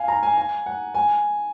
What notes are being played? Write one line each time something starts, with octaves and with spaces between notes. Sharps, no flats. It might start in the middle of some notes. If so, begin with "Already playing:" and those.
Already playing: F5 G#5
A#5
G#5
G#5
F#5
G#5